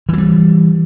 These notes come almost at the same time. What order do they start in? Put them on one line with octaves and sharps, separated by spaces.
E3 F#3 G3